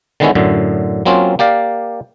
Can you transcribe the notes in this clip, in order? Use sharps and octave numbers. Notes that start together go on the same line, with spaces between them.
D3 D#3 G#3 B3 C#4 E4
F#2 A2 D3
F#3 A#3 C4 C#4 F4
A#3 G4 D5 F5